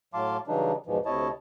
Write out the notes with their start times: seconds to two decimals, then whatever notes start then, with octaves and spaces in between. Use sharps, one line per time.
0.14 A2 F#3 F5 A5 C6 D6
0.47 C#3 E3 F#3 G3 D4 D#4
0.86 E2 G#2 B2 E3 F3
1.06 D2 C3 E4 C#5 D#5 A5